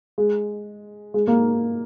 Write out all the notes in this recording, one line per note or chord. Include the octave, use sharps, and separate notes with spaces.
G#3
G#3
A#3